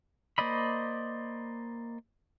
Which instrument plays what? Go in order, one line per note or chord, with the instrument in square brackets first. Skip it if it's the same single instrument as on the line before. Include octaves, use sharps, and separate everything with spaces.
[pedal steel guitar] A#3 C5 D5 D#5 B5